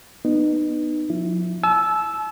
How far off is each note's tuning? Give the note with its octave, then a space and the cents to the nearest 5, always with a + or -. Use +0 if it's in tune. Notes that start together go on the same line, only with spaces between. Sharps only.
B3 +0 D#4 -30
F3 +35 E4 +0
A5 -45 E6 +0